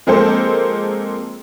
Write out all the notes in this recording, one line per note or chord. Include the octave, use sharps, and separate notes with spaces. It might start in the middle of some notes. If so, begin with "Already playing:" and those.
F3 G#3 A#3 C4 A4 C5